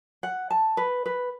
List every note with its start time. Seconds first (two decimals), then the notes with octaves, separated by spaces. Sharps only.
0.23 F#5
0.50 A5
0.77 B4
1.06 B4